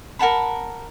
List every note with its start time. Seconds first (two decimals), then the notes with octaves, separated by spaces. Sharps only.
0.19 A#4 F#5 A5 B5